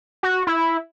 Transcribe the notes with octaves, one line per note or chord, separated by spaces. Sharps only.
F#4
E4